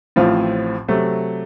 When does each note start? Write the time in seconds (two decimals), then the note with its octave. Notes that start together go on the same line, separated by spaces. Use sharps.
0.16 A1 A2 F3 C4 F4
0.88 C3 F#3 A3